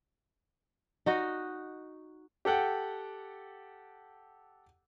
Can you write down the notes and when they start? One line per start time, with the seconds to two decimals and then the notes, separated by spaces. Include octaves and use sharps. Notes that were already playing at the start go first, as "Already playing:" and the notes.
1.06 D#4 F#4 D#5
2.45 G4 A4 F#5 G5